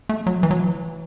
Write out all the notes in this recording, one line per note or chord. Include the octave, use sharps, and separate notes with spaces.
A3
F#3
E3
F#3
E3